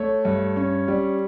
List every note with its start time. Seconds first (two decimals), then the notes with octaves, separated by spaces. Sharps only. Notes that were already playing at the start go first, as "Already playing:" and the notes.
Already playing: A3 C#5
0.25 G2
0.56 C#4
0.88 G3